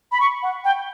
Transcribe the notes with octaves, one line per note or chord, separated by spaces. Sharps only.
B5
C#6
F#5
G5